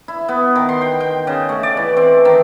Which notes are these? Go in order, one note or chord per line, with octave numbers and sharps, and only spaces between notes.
E4
B3
D#3
C6
G5
G5
C#3
A3
D5
E3
C4
D#3